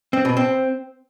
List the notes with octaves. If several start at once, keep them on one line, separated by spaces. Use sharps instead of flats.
C4
B2
C4